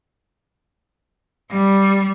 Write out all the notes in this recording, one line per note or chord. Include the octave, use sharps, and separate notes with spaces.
G3